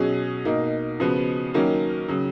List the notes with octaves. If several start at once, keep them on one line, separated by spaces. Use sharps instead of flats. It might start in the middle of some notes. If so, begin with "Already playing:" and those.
Already playing: B2 F#3 C#4 G#4
B2 A#3 D#4
C#3 F3 B3 F#4
D#3 F#3 A#3 C#4
C#3 F#3